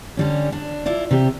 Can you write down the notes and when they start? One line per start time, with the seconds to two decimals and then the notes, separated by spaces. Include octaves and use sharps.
0.17 D3 G3 C#4
0.52 D4
0.86 E4 F4 D5
1.11 C3 G4